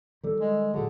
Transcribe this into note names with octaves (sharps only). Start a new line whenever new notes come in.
D#3 G3 A4
G#3
A#2 D3 F#3 G#4